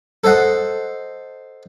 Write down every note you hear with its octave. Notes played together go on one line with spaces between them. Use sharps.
A4 C5 D#5 F#5